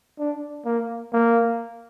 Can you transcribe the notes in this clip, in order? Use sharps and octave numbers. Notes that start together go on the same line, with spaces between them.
D4
A#3
A#3